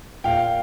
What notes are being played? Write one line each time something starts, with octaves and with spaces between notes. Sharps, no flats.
A#2 F5 G5